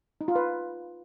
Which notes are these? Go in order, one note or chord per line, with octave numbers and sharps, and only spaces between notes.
D#4
F4
B4